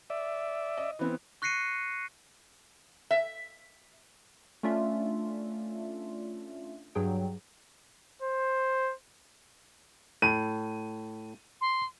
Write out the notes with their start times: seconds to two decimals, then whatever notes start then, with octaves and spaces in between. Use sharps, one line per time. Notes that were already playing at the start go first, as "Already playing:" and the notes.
0.10 D5 E5
0.77 D#5
0.99 E3 B3 C4
1.42 C#6 F#6 A#6 C7 C#7 D#7
3.11 E5
4.63 A3 C#4 D4 F4 D5 E5
6.95 G2 F#3 G#4 G5
8.22 C5
10.22 A2 D#7
11.61 C6